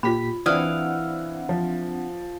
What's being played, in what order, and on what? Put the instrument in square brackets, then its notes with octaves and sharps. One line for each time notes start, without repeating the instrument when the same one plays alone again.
[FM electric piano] A#2 G4 B6 [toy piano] F4 B5
[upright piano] E3 [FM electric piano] C4 D4 F#5 [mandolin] E4 F5 D#6 [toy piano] D5
[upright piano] F3